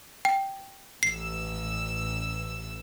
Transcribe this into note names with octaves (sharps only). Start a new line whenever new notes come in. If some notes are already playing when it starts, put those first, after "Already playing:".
G5
A1 E6 C7